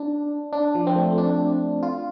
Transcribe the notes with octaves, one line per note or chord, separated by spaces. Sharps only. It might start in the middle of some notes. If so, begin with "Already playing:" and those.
Already playing: D4
D4
F3
C4
A3
D4
F4